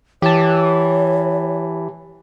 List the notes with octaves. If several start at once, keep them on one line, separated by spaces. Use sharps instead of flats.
E3 G4 C#5 A5